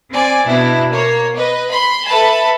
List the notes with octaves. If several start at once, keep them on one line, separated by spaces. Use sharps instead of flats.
C4 D5 G#5
B2 D4 E4
A#3 C#5
B4 D#5
B5 C6
A4 B4 E5 A5 B5